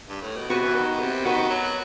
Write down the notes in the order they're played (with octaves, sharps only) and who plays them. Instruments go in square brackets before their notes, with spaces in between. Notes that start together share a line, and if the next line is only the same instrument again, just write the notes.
[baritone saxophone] G2
A2
B2
[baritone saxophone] C3 [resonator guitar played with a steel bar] B3 F#4 B4
[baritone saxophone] E3
D#3
C3
[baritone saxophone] D#3 [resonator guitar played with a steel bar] B3 F#4 B4
[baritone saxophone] F#3